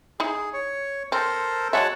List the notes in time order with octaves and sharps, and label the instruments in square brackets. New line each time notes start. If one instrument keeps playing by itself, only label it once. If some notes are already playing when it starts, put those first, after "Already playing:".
[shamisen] D#4 E4 [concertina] G#4
[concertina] C#5
[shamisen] C4 [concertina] A4 A#4 C5
[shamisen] F#3 G#3 E5 [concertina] C#5 F#5 A5